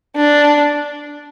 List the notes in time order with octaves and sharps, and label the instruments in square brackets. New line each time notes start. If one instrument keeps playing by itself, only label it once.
[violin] D4